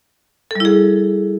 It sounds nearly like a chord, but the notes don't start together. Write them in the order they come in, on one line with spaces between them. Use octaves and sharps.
A4 G3 E4 G#4